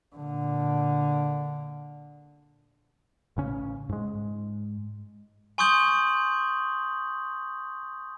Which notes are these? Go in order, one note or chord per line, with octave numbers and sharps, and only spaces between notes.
A#2 D3
A1 C#3 C#4
G#2 G#3
G#5 C6 C#6 D#6 G6 F#7